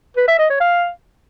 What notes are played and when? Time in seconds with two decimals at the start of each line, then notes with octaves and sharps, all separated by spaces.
0.17 B4
0.28 E5
0.39 D#5
0.50 C#5
0.60 F5